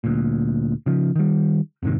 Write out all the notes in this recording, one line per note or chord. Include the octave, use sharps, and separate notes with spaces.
D2 A#2
C#3 F3
D#3 G3
F2 G#2 C3 D#3